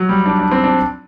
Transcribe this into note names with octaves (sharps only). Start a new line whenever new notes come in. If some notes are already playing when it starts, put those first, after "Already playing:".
Already playing: F#3
G3
D4
D4
C4
D4